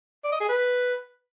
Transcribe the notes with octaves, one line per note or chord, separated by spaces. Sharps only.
D5
D#5
G#4
B4